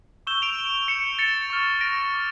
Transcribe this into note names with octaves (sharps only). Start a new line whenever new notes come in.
C#6 E6 G6 E7 G7
D7 F7
C#6 G6 C#7 E7
A6 C#7
C#6 F6
A#6 D7
D6 F6